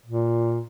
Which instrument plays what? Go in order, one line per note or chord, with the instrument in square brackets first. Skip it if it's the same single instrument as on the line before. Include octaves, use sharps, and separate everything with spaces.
[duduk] A#2